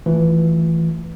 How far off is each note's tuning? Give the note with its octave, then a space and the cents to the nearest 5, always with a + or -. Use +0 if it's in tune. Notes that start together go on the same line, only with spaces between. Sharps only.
E3 +0 A3 +0 F4 +0